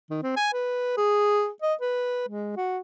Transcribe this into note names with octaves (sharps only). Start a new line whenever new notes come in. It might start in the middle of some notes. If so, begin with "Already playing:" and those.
D#3
C4
G#5
B4
G#4
D#5
B4
G#3
F#4